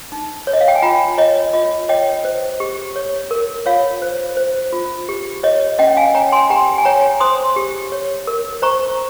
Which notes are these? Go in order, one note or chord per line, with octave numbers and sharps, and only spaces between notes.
D#4
C#5
D#5
F5
G5
G#5
F4 G5 A#5
C#5 D#5
F4 D#5
C#5 D#5 G5
C5
G4
C#5
A#4
F4 C#5 F5
C5
C5
F4
G4
C#5 D#5
C#4 D#5 G5
F5 G#5
C#5 G5 A#5
G#5 C6
G4 G5 A#5
G#5
C#5 G5 A#5
C5 C6 D#6
G4
C#5
A#4
C5 A#5 C#6